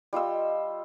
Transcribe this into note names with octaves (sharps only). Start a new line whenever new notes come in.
G3 F4 D#5 E6